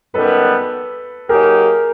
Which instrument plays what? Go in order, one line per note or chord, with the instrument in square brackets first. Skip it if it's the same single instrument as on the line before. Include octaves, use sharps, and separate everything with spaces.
[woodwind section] F#2 D#3 G3 B3 [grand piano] A4 B4
[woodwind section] F#3 A#3 D#4 G4 [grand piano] G#4 A#4